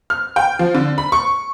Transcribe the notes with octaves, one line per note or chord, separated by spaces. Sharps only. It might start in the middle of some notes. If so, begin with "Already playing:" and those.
F6
G5
F3
D3
B5
C#6